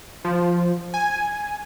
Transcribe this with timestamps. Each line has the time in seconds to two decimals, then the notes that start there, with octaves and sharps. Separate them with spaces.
0.25 F3
0.94 G#5